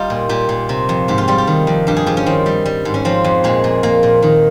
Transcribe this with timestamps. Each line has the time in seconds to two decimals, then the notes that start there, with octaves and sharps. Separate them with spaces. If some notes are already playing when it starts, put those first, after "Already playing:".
Already playing: G3 D#4 F4 G4
0.10 A#2
0.29 A#2 G4
0.49 A#2
0.69 C3
0.89 F2
1.08 G#2 G4
1.18 F4
1.28 G3 G4
1.38 G4
1.47 D#3
1.67 F2
1.87 G2 G4
1.97 G#4
2.06 F3 G4
2.17 C#4
2.26 D#3 C4
2.46 G3
2.66 G3
2.85 G#2
2.94 C#4
3.05 F3 C4
3.24 F2
3.44 A#2 G#3
3.64 A#2
3.83 A#2 A#3
4.03 A#2
4.22 D#3